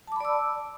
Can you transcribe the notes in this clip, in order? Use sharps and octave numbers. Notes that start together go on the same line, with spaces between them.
D5 A5 B5 D6 E6